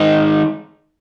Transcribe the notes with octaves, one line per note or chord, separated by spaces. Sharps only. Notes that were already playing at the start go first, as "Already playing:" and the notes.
Already playing: D#3 G#3 D#4